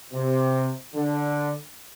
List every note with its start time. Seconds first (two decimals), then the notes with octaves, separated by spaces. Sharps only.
0.13 C3
0.94 D3